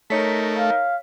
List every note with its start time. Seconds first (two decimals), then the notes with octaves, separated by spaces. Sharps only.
0.10 A3 D#4 A#4 C#5 B6
0.58 F5